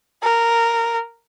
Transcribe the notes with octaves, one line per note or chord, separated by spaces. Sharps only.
A#4